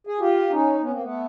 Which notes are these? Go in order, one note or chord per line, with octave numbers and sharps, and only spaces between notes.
G#4
F4 G4
C#4 D#4
B3 C#4
A#3 C4
A3 B3